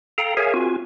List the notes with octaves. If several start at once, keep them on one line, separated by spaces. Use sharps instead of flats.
A4 F5 G5 A#5
G#4 A#4 C#5 E5 F5 G#5
C4 F4 F#4 G#5